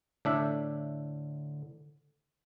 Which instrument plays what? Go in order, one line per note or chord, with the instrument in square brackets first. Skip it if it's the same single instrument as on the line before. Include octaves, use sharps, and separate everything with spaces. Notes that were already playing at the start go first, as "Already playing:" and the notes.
[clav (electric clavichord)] A2 D4 E5 [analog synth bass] D3